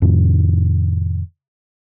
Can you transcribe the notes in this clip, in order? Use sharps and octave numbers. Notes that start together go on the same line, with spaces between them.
F2 A2 C3 D#3